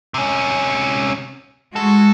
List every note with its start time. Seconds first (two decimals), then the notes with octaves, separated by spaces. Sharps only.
0.14 C3 C#4
1.76 G#3 F#4 A4